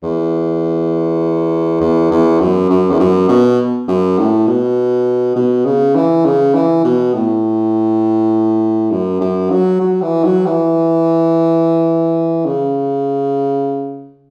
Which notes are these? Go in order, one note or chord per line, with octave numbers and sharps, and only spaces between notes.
E2
E2
E2
F#2
F#2
E2
F#2
B2
F#2
A2
B2
B2
C#3
E3
C#3
E3
B2
A2
F#2
F#2
F#3
F#3
E3
F#3
E3
C#3